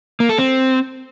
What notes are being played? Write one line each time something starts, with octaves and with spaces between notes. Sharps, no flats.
A#3
A4
C4